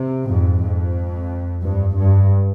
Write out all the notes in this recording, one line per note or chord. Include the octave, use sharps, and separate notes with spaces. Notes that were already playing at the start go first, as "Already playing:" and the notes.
Already playing: C3
F2 G#2
F2
G2
G2